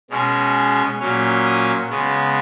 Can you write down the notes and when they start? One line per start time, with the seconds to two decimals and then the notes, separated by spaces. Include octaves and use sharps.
0.10 B2 G#3 C#4 F6
1.00 A#2 F#3 C#4 F6
1.45 D#6
1.90 C#3 G#3 B3